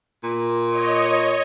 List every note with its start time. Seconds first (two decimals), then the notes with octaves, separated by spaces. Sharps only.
0.23 A#2
0.68 C#5 D#5